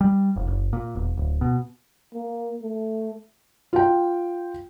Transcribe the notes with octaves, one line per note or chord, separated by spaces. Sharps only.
G3
F1
F#1
A#2
E1
D1
B2
A#3
A3
F4 G5